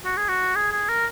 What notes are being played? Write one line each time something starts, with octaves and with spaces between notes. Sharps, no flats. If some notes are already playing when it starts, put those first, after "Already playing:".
F#4
G#4
F#4
G#4
G#4
A#4